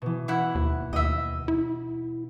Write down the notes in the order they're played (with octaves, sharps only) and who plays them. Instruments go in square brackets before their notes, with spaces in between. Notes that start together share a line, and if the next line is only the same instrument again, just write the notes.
[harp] B2 E3
[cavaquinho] E4 F#5
[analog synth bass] D#2
[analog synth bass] D#2 [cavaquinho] D#5 E5
[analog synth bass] E4